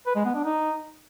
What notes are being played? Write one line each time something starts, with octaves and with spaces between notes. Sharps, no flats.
B4
G#3
B3
D4
D#4